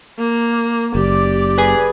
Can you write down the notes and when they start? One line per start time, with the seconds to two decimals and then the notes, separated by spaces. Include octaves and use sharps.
0.18 A#3
0.95 F#1 G4 D5
1.58 G#4 B4